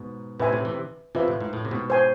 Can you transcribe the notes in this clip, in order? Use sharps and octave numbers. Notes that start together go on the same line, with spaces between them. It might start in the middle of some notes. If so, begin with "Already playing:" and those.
Already playing: G#2 B2
A2 C3 B4 E5 G#5 C6
A2 C3
C3 E3
C3 E3 F4 B4 E5
A2
G#2
A2
C3
G#2 B2
C5 G#5 C6